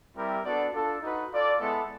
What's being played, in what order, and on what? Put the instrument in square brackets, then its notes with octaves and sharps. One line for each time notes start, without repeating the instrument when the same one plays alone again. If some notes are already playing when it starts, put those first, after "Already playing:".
[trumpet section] G3 C4 E4 G4 A#4
B3 D4 F#4 A4 D5
D4 F4 A4
D#4 F#4 B4
F4 A4 D5
G#3 B3 E4 A4